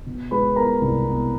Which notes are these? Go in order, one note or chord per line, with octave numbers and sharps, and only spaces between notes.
B2
G#3 B4 B5
B3 A#4 A#5
C2
B3